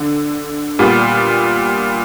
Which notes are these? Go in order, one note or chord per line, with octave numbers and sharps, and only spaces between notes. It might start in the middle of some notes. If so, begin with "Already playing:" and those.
Already playing: D3
A#2 G3 B3